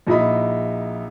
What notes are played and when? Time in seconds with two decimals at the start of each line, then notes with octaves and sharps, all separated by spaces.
0.07 A#1 D#4 E4 D#5 B5